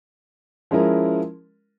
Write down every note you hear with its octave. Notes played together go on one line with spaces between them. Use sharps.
F3 G#3 C#4 E4 A#4